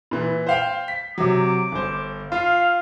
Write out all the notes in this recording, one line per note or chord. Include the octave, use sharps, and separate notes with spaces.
A#2 E3
C5 F5 G5
B6
C3 F#3 D6
G1 C5
F4 F5